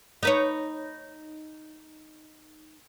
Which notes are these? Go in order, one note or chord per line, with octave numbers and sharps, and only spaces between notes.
D#4 B4 C#5